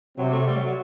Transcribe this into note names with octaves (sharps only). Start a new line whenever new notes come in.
C3 F#3
A3
G3
F#3
F#3